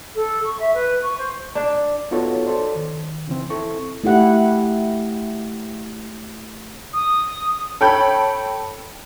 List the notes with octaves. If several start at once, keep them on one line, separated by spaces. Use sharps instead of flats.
A4
C#6
E5
B4
C#6
C5
D4
B3 D#4 F4 F#4 A4 C#5
A4 C5 D5
D#3
C#3 E3 C4
C4 E4 A4 C#6
A3 E4 G4 F#5
D#6
A4 C#5 G5 B5 G6